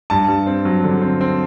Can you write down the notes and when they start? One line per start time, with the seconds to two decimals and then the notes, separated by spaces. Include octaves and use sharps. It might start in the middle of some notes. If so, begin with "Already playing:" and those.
0.10 G2 A5
0.28 G2
0.47 C4
0.65 F#3
0.84 D3
1.02 C4
1.21 C4